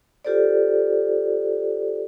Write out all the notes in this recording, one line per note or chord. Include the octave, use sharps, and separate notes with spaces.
F4 G4 A4 C5 D5